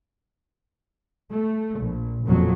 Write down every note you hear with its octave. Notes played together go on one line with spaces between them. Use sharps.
A3
A#1
F#1 F2 A#2 F3 F#3